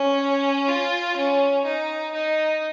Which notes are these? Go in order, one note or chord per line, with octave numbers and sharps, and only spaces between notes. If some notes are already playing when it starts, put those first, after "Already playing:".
Already playing: C#4
F4
C#4
D#4
D#4